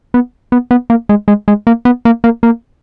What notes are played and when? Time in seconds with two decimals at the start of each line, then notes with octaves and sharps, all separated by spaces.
0.14 B3
0.52 B3
0.71 B3
0.90 A#3
1.09 G#3
1.28 G#3
1.48 G#3
1.67 A#3
1.85 B3
2.05 A#3
2.24 A#3
2.43 A#3